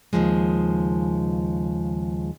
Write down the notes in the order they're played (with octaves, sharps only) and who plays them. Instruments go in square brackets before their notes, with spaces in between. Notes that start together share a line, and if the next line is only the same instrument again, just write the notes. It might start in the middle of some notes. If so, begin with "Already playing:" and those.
[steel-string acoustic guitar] D#2 A2 C#3 F3 G#3